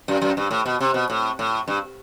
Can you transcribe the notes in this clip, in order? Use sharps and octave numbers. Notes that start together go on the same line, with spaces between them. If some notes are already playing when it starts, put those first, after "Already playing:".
F#2
F#2
G2
A2
B2
C3
B2
A2
A2
G2